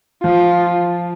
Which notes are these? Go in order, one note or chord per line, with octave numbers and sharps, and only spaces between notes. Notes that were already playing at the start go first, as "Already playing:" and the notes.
F3 F4